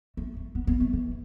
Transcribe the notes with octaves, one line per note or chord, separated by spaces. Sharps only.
A3
A3
B3
B3
A3
E3